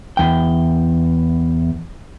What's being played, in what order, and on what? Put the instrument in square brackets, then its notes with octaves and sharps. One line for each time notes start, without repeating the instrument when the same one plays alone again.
[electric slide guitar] E2 G5